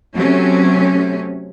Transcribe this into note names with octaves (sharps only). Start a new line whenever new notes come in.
C3 F#3 A3 C4 C#4